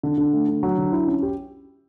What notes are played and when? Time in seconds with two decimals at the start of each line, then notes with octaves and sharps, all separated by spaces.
0.03 D3
0.18 D3
0.33 A3
0.48 D3
0.63 F#3
0.78 D3
0.92 E4
1.07 C#4
1.23 G4